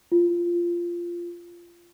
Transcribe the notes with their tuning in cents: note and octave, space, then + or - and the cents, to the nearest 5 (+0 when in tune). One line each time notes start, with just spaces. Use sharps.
F4 -10